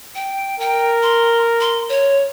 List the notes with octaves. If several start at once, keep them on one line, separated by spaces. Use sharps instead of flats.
G5
A#4 G5
C6
C6
C#5